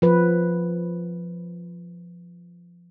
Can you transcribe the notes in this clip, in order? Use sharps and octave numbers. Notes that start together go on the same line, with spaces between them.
F3 B4